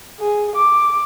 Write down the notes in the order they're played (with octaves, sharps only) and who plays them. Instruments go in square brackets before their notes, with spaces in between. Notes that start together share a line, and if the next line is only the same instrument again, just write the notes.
[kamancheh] G#4
D6